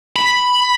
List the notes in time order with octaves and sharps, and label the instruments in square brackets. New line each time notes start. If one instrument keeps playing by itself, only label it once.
[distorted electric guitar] B5